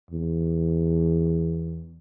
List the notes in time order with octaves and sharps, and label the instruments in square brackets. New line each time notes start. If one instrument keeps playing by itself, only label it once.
[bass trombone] E2